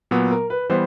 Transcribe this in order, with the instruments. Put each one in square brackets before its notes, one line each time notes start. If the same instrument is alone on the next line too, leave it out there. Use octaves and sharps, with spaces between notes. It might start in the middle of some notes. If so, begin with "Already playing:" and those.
[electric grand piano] A#2 F#3 B3
[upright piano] A#4
B4
[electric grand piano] E3 G3 B3 [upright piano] C5